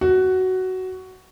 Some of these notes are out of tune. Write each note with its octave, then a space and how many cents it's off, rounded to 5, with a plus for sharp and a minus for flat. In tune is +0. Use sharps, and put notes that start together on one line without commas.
F#4 +10